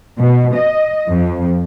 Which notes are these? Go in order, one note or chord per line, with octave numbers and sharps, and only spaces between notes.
B2
D#5
F2